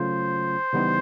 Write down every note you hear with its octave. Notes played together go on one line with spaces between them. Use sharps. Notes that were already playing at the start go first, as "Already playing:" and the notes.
Already playing: C#3 F#3 A3 C#4 F4 C5
C#3 E3 G3 B3 D#4